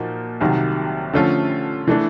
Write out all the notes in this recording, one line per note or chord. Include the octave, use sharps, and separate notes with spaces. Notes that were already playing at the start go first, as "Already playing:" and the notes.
Already playing: A#2 F3 A#3 D#4 F#4
C2 C3 D#3 F#3
D3 F3 A3 C#4 F4
E3 A3 D4